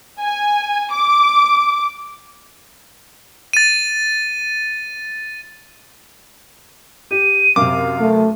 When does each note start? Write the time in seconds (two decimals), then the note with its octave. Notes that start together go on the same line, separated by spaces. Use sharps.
0.21 G#5
0.91 D6
3.53 A6 D#7
7.11 G4 D#7
7.56 F#2 C3 F5 D6
8.01 A3